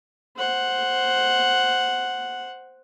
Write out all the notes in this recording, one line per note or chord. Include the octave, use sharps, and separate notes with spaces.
C5 F#5